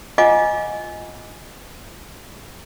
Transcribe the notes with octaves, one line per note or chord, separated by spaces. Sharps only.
F4 D#5 F#5 G#5 D6